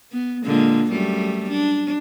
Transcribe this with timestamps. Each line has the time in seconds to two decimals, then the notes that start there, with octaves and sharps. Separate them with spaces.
0.12 B3
0.45 A#2 D3 G#3
0.89 F#2 G3 A3
1.50 D4